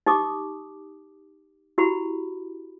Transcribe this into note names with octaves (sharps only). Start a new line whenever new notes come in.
D#4 G4 D6 D#6
E4 F#4 G4 B5